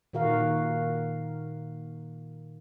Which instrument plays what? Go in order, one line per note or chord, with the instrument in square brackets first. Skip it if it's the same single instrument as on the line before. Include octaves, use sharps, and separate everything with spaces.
[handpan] A#2 D#3 F#4 A#4 F5